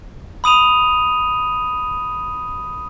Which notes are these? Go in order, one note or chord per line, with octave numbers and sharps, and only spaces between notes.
B5 D#6 D#7 F7